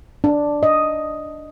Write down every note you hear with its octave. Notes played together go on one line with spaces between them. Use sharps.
D4
D#5